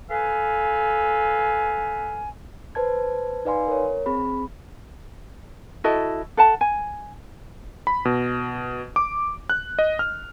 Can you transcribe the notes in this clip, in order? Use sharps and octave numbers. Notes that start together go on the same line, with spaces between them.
A4 B4 F5 G#5
B4 C5 A5 G#6
D#4 B4 D5 F5 G#5 C6
A#4 C#5
C4 G#4 B5
E4 F#4 A4 D#5
A4 F#5 A5
G#5
B5
B2
D6
F#6
D#5
F6